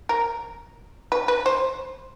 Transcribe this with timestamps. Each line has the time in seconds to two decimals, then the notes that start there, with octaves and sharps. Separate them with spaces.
0.09 A#4
1.12 B4
1.28 B4
1.46 C5